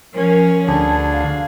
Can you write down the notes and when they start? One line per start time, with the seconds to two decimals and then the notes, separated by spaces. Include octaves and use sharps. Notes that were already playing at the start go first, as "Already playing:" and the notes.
0.13 F3 C#4 A#4
0.67 D2 G#4 A5
1.12 F5